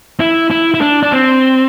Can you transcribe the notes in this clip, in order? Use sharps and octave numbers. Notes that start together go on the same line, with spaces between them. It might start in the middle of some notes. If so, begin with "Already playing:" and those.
E4
E4
E4
D4
D4
C4